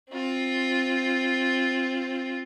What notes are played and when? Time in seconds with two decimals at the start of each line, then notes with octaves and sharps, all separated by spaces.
0.11 C4 F4